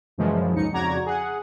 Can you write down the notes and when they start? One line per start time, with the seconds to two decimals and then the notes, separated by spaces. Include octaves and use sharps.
0.18 F#2 A#2 C#3 E3 F3 G#3
0.55 G#1 C#2 D#4 C#7
0.72 F2 C#3 F#4 D5 A#5 G#6
1.06 G#4 F#5